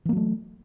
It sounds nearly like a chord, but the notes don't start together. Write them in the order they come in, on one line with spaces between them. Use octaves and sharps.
E3 A#3 F#3 A3